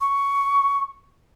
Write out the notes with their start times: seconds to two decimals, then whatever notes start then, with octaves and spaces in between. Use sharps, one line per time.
0.01 C#6